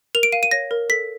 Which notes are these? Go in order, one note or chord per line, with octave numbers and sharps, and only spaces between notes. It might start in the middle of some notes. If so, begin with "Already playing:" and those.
A#4 F7
D7
F5 D#7
D#7
C#5 A#6
A#4
A4 B6